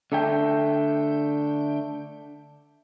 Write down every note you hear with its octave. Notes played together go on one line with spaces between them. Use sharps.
D3 A3 G5